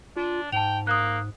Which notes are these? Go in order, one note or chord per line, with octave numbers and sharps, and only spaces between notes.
D4 F4
G#2 G5 A5 F7
A#3 D#6 F#6